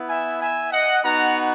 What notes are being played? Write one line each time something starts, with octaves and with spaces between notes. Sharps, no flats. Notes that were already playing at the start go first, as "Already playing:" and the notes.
Already playing: B3 E4
E5 G#5
E5 G#5
D#5 F#5
B3 D#4 F#4 F#5 A#5